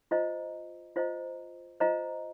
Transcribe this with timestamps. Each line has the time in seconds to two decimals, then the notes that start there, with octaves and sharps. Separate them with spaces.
0.11 F4 C5 D#5 A#5
0.96 F4 C5 D#5 A#5
1.80 F4 C5 D#5 A#5